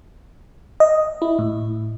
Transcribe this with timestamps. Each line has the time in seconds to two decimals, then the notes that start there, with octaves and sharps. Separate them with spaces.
0.80 D#5
1.22 E4
1.39 A2